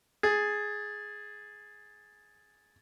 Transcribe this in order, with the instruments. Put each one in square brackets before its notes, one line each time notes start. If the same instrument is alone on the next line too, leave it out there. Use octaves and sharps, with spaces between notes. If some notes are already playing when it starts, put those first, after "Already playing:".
[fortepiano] G#4 [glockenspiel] G#6 A6